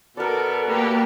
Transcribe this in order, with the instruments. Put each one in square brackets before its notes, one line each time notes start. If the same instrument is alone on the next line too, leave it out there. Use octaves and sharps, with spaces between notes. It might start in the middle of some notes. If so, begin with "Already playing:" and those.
[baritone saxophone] B2 [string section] A4 [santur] A#4 D5
[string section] A#3 G4